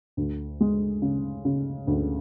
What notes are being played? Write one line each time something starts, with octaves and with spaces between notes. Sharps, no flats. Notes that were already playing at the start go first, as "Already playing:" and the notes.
D2
G#3
C#3
C#3
D2